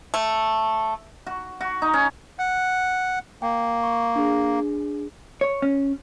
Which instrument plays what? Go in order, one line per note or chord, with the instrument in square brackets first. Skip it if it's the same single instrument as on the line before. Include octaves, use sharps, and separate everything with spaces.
[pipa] A3
[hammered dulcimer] F#4
F#4
D#4
C#4
[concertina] F#5 [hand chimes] F#6
[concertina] A#3 [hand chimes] G5
[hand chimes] C#6
D4 G#4
[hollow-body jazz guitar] C#5
C#4